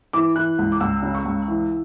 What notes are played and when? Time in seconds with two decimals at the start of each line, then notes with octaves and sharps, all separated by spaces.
0.13 E3 D6
0.36 E3 F#6
0.59 C#2
0.72 D6
0.80 C#2 E6
1.03 C#3
1.15 C#6
1.25 C#2
1.48 E3